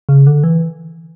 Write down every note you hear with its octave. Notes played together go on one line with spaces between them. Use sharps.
C#3
D3
E3